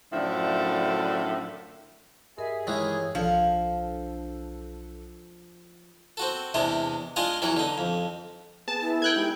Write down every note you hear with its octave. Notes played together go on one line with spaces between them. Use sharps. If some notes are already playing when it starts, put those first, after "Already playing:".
F#2 A2 D3 F3 D4 E5
G2 G#4 A#4 D#5 E5
D#3 E3 G#3 C#5
B1 F3 D4 A4
C4 F#4 A4
E2 C3 G#3 D4 D#5
G#3 D4 F4 G#4 D#5 F5
E2 E3 F#3 F#5
D3 D#4
F2
B3 G#4 A5
E4
A4 G5 F#6 G#6
G#3 D#4 G4